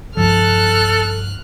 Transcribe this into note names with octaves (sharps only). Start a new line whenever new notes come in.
B1 G2 F3 A4 F6 F#6